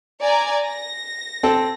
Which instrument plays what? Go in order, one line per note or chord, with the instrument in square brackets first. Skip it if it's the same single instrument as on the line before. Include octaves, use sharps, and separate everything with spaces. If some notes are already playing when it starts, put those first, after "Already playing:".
[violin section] D5 G#5 A#5
A#6
[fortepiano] C4 A4